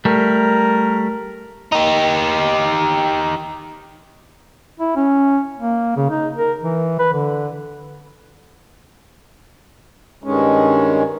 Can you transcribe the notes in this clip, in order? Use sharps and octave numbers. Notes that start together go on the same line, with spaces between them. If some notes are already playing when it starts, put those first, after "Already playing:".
G3 A3 A#4
D#4 G4
E4
C#4
A#3
C#3
D#4
A#4
E3
B4
D3
G2 D#3 G#3 C#4